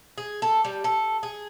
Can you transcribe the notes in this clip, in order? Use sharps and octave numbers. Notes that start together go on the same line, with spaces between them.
G#4
A4
G3
A4
G#4